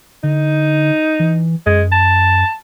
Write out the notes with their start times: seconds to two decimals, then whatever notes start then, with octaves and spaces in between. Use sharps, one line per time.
0.24 D3 D#4
1.20 E3
1.66 F#2 G#3
1.92 A5